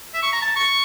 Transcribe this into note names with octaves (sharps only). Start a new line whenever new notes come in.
E5
C#6
A#5
A5
C#6